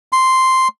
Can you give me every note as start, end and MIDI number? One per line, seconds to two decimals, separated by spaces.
0.13 0.68 84